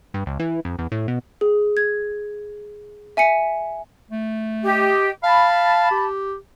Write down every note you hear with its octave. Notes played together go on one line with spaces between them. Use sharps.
G2
C#2
E3
F2
E2
A2
B2
G#4
G#6
E5 G#5 B6 C#7
A3
G4 D#5
F5 A5 B5
G4